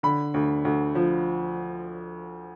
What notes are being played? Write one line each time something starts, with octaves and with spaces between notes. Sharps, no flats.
D3 B5
D2
D2
F3